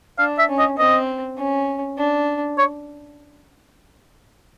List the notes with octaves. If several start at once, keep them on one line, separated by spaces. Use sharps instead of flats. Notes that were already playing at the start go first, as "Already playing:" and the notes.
D4 F5
E5
C#4
D#5
C4 D#5
C#4
D4
C#5